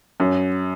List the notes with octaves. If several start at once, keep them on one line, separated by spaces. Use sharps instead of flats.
F#2